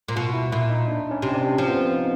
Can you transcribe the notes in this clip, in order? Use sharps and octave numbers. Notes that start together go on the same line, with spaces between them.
A#2
B2 F4
E4
A#2 E4
D#4
D4
C#4
C3
D4
F3 C#4
B3
C4
D#4